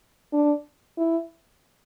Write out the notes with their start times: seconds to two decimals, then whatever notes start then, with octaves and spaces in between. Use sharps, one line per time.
0.33 D4
0.97 E4